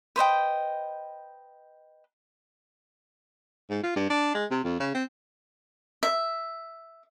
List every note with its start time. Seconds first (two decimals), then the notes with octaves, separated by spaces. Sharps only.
0.16 B4 C5 D#5 G5
3.70 G#2
3.83 F4
3.96 G2
4.10 D4
4.34 G#3
4.51 C3
4.64 F2
4.80 C#3
4.94 C4
6.03 E5